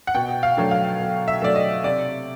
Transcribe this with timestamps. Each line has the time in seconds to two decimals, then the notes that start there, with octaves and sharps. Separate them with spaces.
0.07 F#5
0.15 B2 G5
0.43 F5
0.57 F#3 A3 D4
0.71 F5
0.99 B2
1.28 E5
1.42 F#3 A3 D4 D5
1.56 D#5
1.84 C3 D5